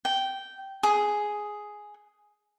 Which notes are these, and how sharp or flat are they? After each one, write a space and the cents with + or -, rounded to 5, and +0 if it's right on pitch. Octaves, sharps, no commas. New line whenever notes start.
G5 -10
G#4 +5